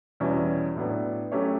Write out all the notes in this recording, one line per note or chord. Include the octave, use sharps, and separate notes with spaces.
E2 B2 G3 C#4 E4
A2 F#3 B3 D4
F#3 A3 C#4 G4 C#5